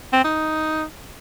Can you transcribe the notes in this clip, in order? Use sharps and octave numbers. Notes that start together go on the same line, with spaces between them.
C4
D#4